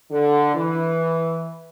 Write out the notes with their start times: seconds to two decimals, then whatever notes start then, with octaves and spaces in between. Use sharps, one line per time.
0.11 D3
0.54 E3